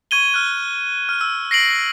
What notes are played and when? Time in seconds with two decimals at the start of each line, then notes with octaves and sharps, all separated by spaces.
0.11 C#6 G#6 D#7 G7
0.32 F6 F#6 G#6
1.09 F6
1.21 E6
1.51 A#6 C7 D7 F#7